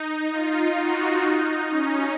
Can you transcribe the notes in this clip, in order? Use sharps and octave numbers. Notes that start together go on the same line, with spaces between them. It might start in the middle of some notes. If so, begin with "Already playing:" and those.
Already playing: D#4
F4
F#4
D#4
C#4